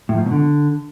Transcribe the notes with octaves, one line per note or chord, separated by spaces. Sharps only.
A2
F3
G#2
B2
D3